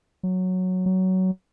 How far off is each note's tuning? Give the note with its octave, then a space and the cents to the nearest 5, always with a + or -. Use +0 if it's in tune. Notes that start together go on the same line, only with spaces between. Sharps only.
F#3 -5
F#3 +15